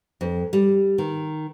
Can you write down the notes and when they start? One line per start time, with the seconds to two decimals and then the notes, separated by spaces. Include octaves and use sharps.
0.21 F2
0.53 G3
0.98 D#3